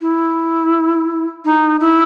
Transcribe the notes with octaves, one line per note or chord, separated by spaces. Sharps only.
E4
D#4
E4